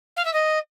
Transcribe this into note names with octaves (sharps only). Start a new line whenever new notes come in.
F5
E5
D#5